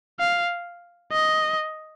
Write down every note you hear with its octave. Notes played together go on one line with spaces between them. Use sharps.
F5
D#5